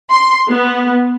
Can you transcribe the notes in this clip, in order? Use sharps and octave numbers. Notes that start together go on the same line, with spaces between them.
C6
B3